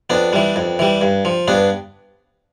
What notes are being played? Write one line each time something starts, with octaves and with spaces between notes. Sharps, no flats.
F2 B3 D4
E3 G3
F2
E3 G3
G2
F3
G2 B3 D4